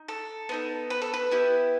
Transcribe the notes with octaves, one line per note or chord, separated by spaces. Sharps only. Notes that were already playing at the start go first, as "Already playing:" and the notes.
Already playing: D#4
A4
B3 D#4 A4
B4
A4
B4
B3 E4 G4